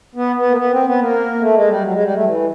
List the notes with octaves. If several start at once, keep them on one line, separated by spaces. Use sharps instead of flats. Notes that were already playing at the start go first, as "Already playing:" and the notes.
B3
B3
A#3
B3
C4
B3
A#3
A3
G#3
G3
F#3
G#3
G3
A3
E3